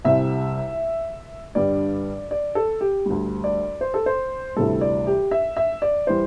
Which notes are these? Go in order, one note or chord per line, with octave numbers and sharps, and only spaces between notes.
C2 C3 G3 E5
G2 D3 G3 D5
D5
A4
G4
D2 D3 G3
D5
C5
A4
C5
D2 C3 E3 G3 A4
D5
G4
E5
E5
D5
E3 G3 C5